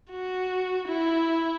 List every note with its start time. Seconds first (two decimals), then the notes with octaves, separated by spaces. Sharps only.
0.11 F#4
0.88 E4